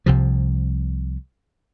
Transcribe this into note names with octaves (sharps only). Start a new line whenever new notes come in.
C2 C3 F3